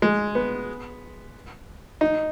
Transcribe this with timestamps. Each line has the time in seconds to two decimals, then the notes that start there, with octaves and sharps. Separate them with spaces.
0.02 G#3
0.35 B3
2.01 D#4